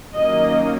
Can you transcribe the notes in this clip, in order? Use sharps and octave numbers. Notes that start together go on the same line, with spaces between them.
D#3 F#3 A#3 C#4 D#5